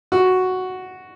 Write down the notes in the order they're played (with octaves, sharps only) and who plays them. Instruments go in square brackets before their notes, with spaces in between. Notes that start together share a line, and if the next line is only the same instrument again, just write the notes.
[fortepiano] F#4